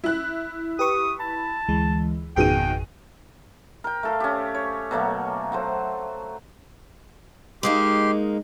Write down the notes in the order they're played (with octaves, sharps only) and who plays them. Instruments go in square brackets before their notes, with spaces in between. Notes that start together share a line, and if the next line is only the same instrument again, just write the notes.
[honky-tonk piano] E4 F#6
[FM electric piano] G4 B4 C#6 [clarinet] D#6
[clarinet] A5 [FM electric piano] B5
[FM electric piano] D2 E3 G#3
[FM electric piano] G#1 F2 G#4 [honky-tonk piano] B2 D#3 D#7 [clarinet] G5
[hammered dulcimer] A#4 G5
A3 A4 F5
C#4 G4
C#5
B2 F#3 A3 A#3
F#3 A3 C5
[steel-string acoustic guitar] G#3 A#3 D#4 [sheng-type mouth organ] G4 C6